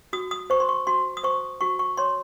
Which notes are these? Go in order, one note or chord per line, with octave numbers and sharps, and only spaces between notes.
F#4 D#6
D#6
C5 C#6
C6
C#6
F#4 C6
D#6
C5 C#6
F#4 C#6
C#6
C#5 C6